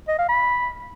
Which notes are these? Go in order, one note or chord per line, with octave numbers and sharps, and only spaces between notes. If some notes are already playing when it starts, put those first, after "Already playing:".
D#5
F5
B5